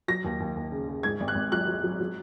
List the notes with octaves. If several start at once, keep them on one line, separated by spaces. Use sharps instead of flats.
F#3 A#6
D#2
D#2
D#2
C#3
C#3
G#2 G#6
G#1
F#6
G#1
F#3 F#6
F#3
F#3
F#3